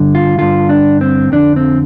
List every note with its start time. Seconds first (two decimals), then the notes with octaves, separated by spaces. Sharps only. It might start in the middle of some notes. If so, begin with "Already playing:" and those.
Already playing: G2 D3
0.15 F4
0.38 G2 D3 F4
0.69 D4
1.01 C4
1.32 F2 D3 D4
1.56 C4